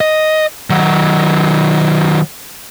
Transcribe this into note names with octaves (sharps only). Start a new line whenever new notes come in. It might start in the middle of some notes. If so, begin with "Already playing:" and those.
D#5
D#3 F#3